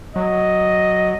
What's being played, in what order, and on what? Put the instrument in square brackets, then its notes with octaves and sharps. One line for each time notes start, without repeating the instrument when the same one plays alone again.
[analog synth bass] F#3 [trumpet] D#5